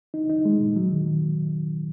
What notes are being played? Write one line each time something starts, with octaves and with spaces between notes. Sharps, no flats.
D#4
D#4
G#3
A#2
F#3
D#3